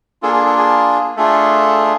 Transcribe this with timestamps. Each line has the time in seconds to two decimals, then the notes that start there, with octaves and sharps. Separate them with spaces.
0.23 A#3 D4 F4 G#4 A4
0.34 G#4
0.46 A4
0.58 G#4
1.16 A3 D4 F4 G#4 A4